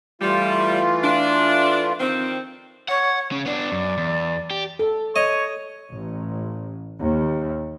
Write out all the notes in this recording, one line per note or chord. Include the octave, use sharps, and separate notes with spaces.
E3 G3 A3 F4
D4
D#3 F3 C4
C#5 F#5
C#3 C#4
B3 D4 D5
F#2
E2
G4
A4
C#5 D#5
A1
D#2